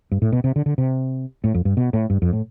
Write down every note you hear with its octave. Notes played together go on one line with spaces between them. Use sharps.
G2
A2
B2
C3
D3
D3
C3
A2
F2
G2
B2
A2
G2
F2
A2